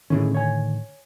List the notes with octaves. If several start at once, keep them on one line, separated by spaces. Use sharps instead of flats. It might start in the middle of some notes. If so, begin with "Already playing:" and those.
A2 D3 D#3 C#4 E4 G#4
C#5 G#5